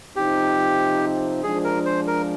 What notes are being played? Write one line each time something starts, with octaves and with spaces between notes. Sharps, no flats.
C3 F3 C4 D#4 G4
F3 G#3 D4 G#4
A#4
C5
A#4